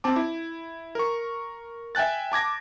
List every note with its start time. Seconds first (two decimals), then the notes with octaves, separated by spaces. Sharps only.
0.04 C4 A5 D6
0.16 E4
0.95 A#4 C#6
1.95 E5 G5 G#5 F#6 A6
2.32 A5 D6 G#6 A#6